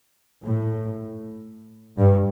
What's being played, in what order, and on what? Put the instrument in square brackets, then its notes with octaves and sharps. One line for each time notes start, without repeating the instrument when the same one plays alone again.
[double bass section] A2
G2